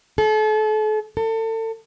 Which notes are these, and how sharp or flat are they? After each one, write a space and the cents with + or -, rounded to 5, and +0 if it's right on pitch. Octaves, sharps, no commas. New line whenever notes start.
A4 -40
A4 +30